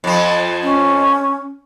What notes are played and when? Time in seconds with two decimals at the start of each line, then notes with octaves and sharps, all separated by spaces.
0.04 F2 F3
0.62 C#4